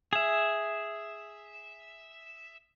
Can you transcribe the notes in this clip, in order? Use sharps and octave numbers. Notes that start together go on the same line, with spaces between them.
G#4 E5